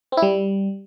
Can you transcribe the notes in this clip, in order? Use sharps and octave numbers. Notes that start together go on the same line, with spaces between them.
C4
E4
G3